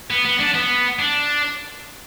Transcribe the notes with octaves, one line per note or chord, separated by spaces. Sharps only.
B3
B3
D4
B3
D4